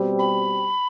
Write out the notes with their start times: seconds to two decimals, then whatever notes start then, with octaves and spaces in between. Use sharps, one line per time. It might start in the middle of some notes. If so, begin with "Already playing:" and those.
Already playing: B2 G3 C4 G4
0.19 B5